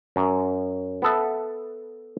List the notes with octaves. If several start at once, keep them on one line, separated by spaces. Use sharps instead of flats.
F#2
B3 A4 E5